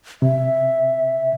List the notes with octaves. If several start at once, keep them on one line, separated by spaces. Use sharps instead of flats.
C3 E5